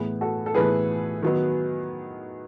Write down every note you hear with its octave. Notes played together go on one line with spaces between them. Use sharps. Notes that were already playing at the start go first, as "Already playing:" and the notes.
Already playing: A2 E3 B3 G#4 B4
F#4 A4
A4
A2 E3 B3 G#4 B4
D#3 F#3 B3